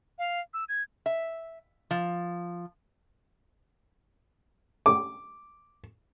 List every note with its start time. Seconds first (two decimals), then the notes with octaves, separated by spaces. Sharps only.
0.19 F5
0.54 E6
0.69 G#6
1.06 E5
1.91 F3
4.86 D6